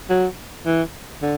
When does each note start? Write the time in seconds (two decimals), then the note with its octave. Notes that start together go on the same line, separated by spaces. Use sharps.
0.09 F#3
0.66 E3
1.22 D3